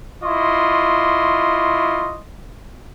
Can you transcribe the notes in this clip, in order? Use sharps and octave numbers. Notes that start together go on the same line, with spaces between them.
E4 F4 D#5 C6 C#6